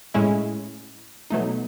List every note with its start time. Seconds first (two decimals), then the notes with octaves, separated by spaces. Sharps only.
0.14 A2 G#3 C#4 E4
1.30 B2 F#3 A3 D#4